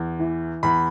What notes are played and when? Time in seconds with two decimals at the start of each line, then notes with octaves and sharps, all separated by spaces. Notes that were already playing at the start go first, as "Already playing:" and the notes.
Already playing: E2
0.19 E3
0.63 E2 B5